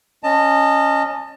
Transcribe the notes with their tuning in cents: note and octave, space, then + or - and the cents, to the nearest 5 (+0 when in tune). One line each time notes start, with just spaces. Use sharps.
C#4 +0 D#5 -15 A5 +25